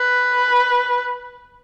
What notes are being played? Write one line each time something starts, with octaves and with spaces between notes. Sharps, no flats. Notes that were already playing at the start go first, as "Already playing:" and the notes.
Already playing: B4